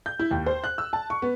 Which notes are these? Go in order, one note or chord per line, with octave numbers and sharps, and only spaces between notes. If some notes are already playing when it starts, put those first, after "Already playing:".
G6
E4
D#2
C5
F#6
E6
A5
C#6
B3